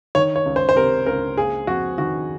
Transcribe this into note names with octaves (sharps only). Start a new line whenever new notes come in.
D#3 C#5
C#5
C#2
C5
C5
C3 A#4
C#2 A#4
A#3 G#4
F2 F#4
D#3 F#4